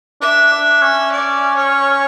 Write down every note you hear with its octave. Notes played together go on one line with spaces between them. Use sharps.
D4 E5
D4
C#4
D5
C#5